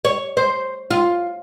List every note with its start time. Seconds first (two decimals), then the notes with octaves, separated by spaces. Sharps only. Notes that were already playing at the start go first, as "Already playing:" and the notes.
0.05 C#5
0.37 C5
0.91 F4